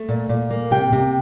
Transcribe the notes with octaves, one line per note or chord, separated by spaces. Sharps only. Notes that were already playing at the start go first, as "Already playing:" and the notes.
Already playing: A3
A#2
A#2
A#3
C3 G5
C3